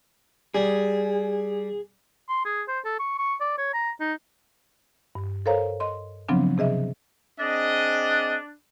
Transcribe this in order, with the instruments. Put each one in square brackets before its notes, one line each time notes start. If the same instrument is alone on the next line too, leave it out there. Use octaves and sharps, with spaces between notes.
[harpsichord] G3 [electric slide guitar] G#4
[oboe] C6
G#4
C5
A4
C#6
C#6
D5
C#5
A#5
D#4
[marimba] G2
A4 A#4 C5 C#5 F5 A#5
D#5 C6
C#3 F3 F#3 B3 C4 D4
C3 G#4 D#5 E5
[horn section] C4 G#4 D#5 [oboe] D4